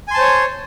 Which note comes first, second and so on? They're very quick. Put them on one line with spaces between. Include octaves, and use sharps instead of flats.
G#5 C6 A5 C5 C#5